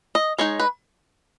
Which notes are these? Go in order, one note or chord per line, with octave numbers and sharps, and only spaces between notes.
D#5
G#3 D#4 C#5
B4